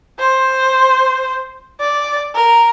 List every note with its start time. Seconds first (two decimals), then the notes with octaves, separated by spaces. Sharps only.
0.20 C5
1.81 D5
2.35 A#4